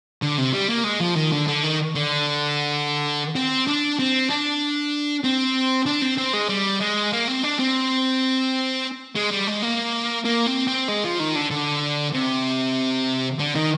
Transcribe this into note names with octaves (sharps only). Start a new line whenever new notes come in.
D3
C3
G3
A#3
G#3
F3
D#3
D3
D3
D#3
D3
C4
D4
C4
D4
C4
D4
C4
C4
G#3
G3
G#3
A#3
C4
D4
C4
G#3
G3
G#3
A#3
A#3
C4
C4
G#3
F3
D#3
D3
D3
C3
D3
D#3